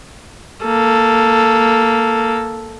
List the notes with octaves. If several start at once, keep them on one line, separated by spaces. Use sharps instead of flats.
A#3 A4